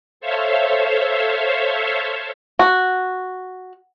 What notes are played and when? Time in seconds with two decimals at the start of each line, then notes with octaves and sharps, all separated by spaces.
0.20 A4 C5 C#5 E5 F5
2.59 F#4